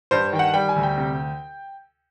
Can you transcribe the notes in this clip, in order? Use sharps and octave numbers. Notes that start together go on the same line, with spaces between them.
G2 C5
D#3 G5
F#5
G3 G5
G#5
D2
G5
C3